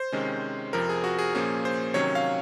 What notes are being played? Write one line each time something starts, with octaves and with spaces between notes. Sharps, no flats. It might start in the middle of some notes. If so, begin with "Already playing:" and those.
Already playing: C5
C3 D#3 G#3 C#4
F2 C3 F3 A#4
G#4
F#4
G#4
A#2 F3 A#3 C#4 G#4
C5
C3 D#3 F#3 C#4 C#5
F5